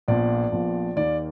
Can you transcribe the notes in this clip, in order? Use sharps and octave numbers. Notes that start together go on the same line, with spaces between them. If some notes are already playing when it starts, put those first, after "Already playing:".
A#1 A#2 F3 B3 D5
A#1 A#2 F3 B3
D#2 D#3 A#3 D5